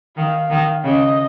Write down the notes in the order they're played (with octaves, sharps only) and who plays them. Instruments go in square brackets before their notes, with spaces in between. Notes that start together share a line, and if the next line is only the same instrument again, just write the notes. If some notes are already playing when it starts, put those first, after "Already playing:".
[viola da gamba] D#3 [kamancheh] F5
[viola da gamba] D#3
[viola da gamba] C#3 [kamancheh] D#5